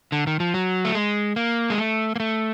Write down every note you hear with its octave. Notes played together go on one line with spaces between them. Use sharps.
D3
D#3
F3
F#3
A3
G#3
A#3
G#3
A3
A#3
A3